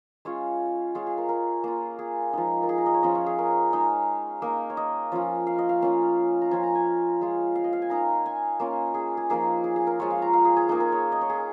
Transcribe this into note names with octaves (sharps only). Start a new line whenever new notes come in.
G#3 C#4 F4 C#5
G#3 F4 C#5
G#4
A#4
A#4
A#3 F4
G#4
F3 G#3 D#4
A#4
G#4
A#4
D#5
C#5
F3 C#4 F4 D#5
C#5
G#4
A#4
G#3 D#4
A#3 D#4
C#5
D#5
F3 C#4 F4
F5
D#5
F5
A#3 C#4 F4 F5
A#5
F3 C#4 F4 G#5
A#5
G#5
G#3 F4
F5
D#5
F5
G#5
A#3 D#4 A#5
G#5
A#3 C#4 F4
G#4
G#4
F3 A#3 D#4 G#4
G#4
G#4
A#4
F3 G#3 F4 C#5
F5
A#5
F5
G#4
G#4
A#3 D#4 G#4
A#4
C#5
D#5
C#5
G#4